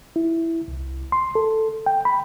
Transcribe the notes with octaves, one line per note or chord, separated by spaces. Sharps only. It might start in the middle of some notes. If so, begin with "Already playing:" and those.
E4
C2
C6
A4
G5
B5